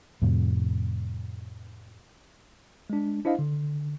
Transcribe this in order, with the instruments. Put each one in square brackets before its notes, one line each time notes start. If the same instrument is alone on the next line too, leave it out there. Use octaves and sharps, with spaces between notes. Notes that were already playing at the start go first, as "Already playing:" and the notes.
[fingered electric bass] F2 A2 C3
[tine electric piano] G#3 D4
D4 E4 C5 D#5 F5
D3